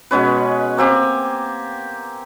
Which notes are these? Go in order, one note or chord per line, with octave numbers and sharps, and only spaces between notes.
B2 G#3 C#4 B4
A#3 C4 G4 G#5